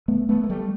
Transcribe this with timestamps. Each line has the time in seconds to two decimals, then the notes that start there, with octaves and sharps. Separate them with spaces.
0.08 A3 B3
0.29 A3 B3
0.44 A#3
0.49 G3 A3